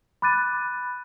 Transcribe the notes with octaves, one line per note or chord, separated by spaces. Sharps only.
B5 D6 F#6 A6 D#7